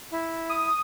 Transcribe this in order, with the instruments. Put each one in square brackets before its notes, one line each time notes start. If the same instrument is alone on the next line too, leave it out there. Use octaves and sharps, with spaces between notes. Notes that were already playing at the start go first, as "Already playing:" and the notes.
[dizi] E4
[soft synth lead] D#6